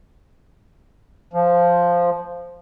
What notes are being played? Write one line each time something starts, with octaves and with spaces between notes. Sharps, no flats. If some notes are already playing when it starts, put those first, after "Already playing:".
F3